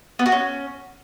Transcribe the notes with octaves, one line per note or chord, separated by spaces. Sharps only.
B3
F#4
C#4